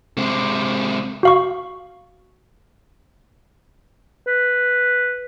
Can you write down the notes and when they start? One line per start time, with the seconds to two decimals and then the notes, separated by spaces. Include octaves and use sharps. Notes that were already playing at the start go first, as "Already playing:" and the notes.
0.17 C3 G#3
1.23 F#4 F5 C#6
4.27 B4